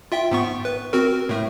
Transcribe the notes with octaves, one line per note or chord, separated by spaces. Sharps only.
F4 E5 G5
G#2 B3 C#6
B4
C4 F#4 A#4
A2 A3